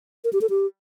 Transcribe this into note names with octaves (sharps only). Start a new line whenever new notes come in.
A#4
G4
A4
G4